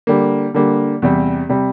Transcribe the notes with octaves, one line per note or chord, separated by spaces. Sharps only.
D3 G3 A#3
D3 G3 A#3
E2 C3 G3
C3 G3